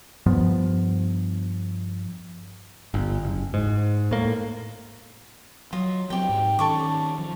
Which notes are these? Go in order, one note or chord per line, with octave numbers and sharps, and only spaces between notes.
G2 F3 B3
G1
F#1
G#2
A2 A#3
F#3 F4 D#5
F#3 B3 C4 G4 G5
G#2
D#3 C#4 A4 C#6 D6
F3